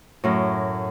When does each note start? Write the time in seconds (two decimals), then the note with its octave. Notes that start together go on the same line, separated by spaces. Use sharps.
0.24 F#2 A2